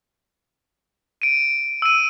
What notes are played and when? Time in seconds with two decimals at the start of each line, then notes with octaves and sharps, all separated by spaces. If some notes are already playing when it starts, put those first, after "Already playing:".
1.22 D7 D#7
1.82 E6 D#7